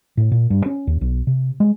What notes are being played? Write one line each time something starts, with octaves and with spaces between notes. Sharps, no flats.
A2
A#2
G2
C#4
D#2
B1
C3
G#3